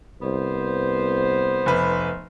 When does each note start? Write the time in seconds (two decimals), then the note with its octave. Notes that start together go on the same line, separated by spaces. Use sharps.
0.22 C2 B3 C5
1.66 F1 B4